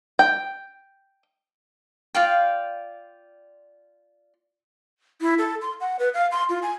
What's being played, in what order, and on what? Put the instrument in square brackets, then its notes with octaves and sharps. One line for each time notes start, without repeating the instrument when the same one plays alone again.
[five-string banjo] G5
[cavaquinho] F4 D5 F5 G5
[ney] E4
A4
C6
F#5
B4
F5
C6
F4
G#5